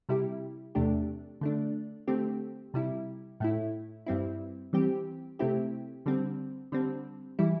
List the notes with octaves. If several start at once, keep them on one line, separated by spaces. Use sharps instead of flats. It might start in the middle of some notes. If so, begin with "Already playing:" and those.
C3 G3 E4 G4
E2 C3 A3 D4 G4
D3 A3 D4
D3 A3 C4 G4
C3 G3 E4
A2 A3 E4
G2 G3 C4 E4
E3 G3 C4 G4
C3 A3 C4 E4 G4
D3 G3 C4
D3 G3 C4
E3 G3 E4